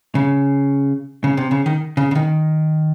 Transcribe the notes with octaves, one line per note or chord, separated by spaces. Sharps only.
C#3
C#3
C3
C#3
D#3
C#3
C#3
D#3